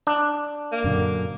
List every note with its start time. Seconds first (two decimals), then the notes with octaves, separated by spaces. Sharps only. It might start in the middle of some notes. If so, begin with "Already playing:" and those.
0.07 D4
0.72 A#3
0.84 F#2 A#2 D3